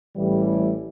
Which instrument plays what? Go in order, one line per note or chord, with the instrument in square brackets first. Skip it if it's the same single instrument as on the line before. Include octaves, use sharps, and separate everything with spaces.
[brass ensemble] A1 A2 E3 G3